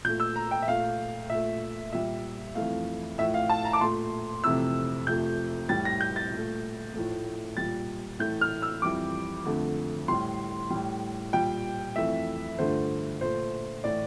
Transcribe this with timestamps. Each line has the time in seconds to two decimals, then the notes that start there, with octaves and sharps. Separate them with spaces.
0.04 A#2 G6
0.08 A3
0.20 E6
0.36 A#5
0.51 G5
0.62 E5
0.68 A#2 A3 F5
1.30 A#2 A3 E5
1.92 A#2 G3 E5
2.55 F2 E3 A3 F5
3.18 A2 F3 A3 E5
3.34 F5
3.50 A5
3.65 A#5
3.73 D6
3.81 A#2 A3 C6
4.44 F2 C3 E3 A3 E6
5.07 F2 C3 F3 A3 G6
5.69 A2 G3 A6
5.85 A#6
6.01 G6
6.16 A6
6.31 A#2
6.37 A3
6.94 A2 F3 A3
7.57 A#2 G3 A6
8.19 A2 E3 A3 G6
8.41 F6
8.62 E6
8.82 F2 E3 G3 D6
9.45 F2 D3 A3
10.08 A2 G3 C6
10.70 A2 G3
11.33 A#2 G3 G5
11.96 F2 E3 A3 E5
12.58 G2 D3 F3 A3 C5
13.21 A#2 A3 C5
13.84 A2 E3 A3 D5